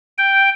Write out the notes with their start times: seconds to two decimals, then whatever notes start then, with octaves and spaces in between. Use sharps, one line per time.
0.18 G5